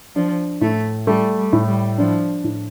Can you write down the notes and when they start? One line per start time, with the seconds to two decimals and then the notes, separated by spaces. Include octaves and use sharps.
0.16 F3 D4
0.61 A2 A3
1.07 G3 A3
1.38 G3
1.53 A2
1.68 G3
1.98 F3 D4
2.44 A2